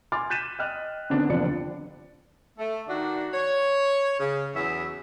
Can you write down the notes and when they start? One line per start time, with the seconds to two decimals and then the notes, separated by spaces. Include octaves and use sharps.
0.12 G#5 C6 D6 F6 A6
0.30 F#6 G6 A6 B6 D#7 E7
0.59 D#5 G5 F6 F#6
1.10 D3 D#3 B3 C4 D4
1.29 F#1 D#2 F3 D4 D5 C#7
2.58 A3
2.88 D#3 D4 F#4
3.33 C#5
4.20 C#3
4.55 E2 F#3 C#4 E4 F#4 E5